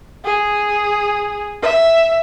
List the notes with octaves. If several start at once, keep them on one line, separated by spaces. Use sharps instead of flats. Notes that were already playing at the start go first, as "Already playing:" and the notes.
G#4
E5